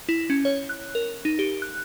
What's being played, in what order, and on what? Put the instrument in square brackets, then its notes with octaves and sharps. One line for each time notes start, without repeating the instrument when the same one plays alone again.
[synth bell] E4
C#4
C#5
F#6
A#4
D#4
G4
F#6